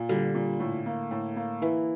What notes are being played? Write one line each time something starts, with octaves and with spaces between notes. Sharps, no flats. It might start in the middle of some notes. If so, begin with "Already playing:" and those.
Already playing: A#2
D3 G3
A#2
A2
A#3
A2
A#3
E3 E4